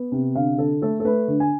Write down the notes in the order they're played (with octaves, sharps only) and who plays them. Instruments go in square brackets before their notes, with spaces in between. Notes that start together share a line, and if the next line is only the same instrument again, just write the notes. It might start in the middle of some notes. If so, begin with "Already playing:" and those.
Already playing: [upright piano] B3
C3
D3 F5
D3 A4
A3 A4
A4
A3 B4
D3
G#5